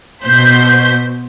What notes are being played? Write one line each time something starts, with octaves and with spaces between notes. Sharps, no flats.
B2 C5 G6 B6